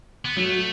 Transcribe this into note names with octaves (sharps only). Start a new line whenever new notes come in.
B3
F#3 A3